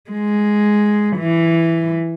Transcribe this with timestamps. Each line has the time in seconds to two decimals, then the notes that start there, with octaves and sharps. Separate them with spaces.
0.10 G#3
1.17 E3